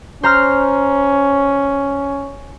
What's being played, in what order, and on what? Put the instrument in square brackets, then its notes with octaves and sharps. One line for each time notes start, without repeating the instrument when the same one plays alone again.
[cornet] C#4 [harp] C5 A#5 F6